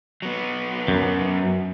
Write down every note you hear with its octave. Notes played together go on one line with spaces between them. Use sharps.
F#3 B3
F#2